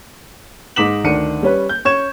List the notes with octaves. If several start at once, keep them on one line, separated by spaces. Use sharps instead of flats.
G#2 D#4 D6 B6 E7 F#7
D2 D#3 D4 C#7 D#7
G3 C#4 B4
G6
C#4 C#6 G#6 E7